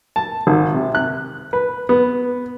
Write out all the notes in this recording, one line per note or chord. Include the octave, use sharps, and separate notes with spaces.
A5
G#1
C3
F#6
B4
B3